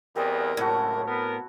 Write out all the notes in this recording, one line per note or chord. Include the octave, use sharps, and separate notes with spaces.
E2 G3 C4 A#4 D#5
C#2 F#2 A2 E4 F#4
B3 A#4